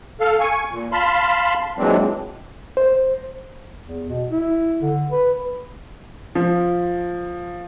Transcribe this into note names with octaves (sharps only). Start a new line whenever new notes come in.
A4 F5
G#5 C#6
A#2
F5 A5 B5 C6
A#2 E3 F#3 G#3 C4 D4
C5
E2
B2
E4
D3
B4
F3